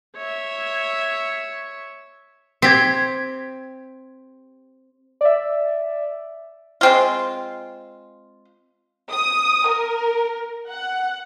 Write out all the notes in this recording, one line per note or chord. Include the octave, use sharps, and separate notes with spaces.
C#5 E5
C4 G4 G#6 B6
D5 E5
G#3 C4 F4
D#6
A#4
F#5